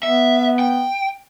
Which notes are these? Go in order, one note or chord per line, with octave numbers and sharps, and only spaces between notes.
B3 E5
G5